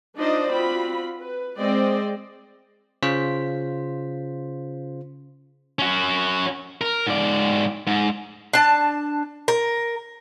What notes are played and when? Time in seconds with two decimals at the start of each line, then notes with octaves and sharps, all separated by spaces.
0.18 D4 D#4 F4 C5 D5 D#5
0.51 C4 F4 F#4 B5
1.19 B4
1.59 G#3 C4 C5 D5 D#5 G5
3.03 C#3 F4 C5 B6
5.79 C#4 F#4
6.81 A#4
7.07 G#2 D5
7.87 G#2
8.53 D4 A5
9.48 A#4